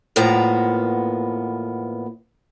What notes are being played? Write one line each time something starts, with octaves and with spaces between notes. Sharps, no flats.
E2 A2 F3 A#3 B3 A#5